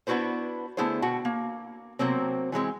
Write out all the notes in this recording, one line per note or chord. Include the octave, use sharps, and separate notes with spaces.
B3 D4 E4 F#4 B4 C5
D3 A3 B3 E4 G#4 C5
B2 F#4 F#5 G5
A#3
C3 F#3 A#3 C4
E3 F#3 G#3 C4